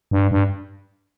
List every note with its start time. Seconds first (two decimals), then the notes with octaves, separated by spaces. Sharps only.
0.11 G2
0.31 G2